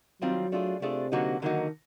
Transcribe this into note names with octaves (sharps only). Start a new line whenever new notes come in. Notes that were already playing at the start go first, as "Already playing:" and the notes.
D#3 F#3 G3 C4 F4
A3 D4 F4 G#4
C3 A3 D4 F4 G#4
D3 F#3 A#3 D#4 F#4
D3 D#3 F#3 A#3 D#4 F#4